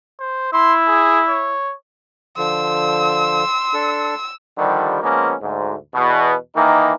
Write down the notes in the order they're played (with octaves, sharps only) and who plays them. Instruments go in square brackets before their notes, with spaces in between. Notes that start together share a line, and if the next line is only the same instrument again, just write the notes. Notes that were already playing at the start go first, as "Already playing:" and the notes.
[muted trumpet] C5
[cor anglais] E4 [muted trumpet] C6
[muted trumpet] G#4
C#5
[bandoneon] D3 F3 [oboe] C6 [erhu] E6
[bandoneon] D4 A4
[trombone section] D3 D#3 F3 G3
F3 G#3 A#3 B3 C#4
D2 G#2
E2 B2
D#3 E3 A#3 D#4